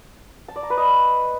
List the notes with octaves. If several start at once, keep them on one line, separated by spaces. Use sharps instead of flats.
A5
D5
A#5
B4
D#5